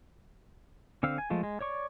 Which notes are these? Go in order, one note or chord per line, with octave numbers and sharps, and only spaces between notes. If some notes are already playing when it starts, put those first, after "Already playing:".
D3 C4 F5 E6
G#5
F3 G#3 A3 F4
G#3
C#5 D5 C#6